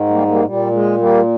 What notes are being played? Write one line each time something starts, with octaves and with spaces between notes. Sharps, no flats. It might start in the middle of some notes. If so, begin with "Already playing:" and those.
Already playing: G#2 D#3
G3 A#3
G3 A#3
A#2 G3
G#3
G3 A#3